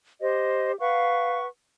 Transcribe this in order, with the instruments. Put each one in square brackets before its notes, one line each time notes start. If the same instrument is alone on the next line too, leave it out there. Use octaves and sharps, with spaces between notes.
[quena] G4 [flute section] C5 D#5
[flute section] B4 F#5 C#6 [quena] F5